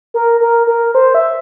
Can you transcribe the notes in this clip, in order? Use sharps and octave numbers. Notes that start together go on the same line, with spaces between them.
A#4
A#4
A#4
C5
E5